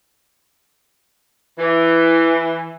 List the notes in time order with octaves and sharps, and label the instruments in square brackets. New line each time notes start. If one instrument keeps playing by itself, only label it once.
[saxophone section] E3